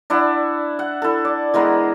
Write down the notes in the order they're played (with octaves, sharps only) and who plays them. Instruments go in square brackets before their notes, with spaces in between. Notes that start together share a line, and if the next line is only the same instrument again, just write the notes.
[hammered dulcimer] D4 E4 F#5
F#5
E4 A4
D5
E3 G#3 B3 A#4